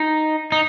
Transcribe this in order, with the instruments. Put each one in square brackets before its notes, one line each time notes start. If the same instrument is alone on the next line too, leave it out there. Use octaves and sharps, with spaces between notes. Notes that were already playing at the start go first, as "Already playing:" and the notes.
Already playing: [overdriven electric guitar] D#4
D#4